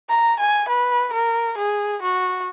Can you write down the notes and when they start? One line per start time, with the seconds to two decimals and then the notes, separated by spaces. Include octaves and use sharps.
0.09 A#5
0.40 G#5
0.69 B4
1.13 A#4
1.58 G#4
2.03 F#4